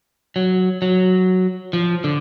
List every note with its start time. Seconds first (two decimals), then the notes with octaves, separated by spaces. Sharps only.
0.36 F#3
0.82 F#3
1.73 F3
2.04 D3